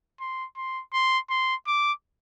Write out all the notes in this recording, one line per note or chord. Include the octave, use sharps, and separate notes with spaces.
C6
C6
C6
C6
D6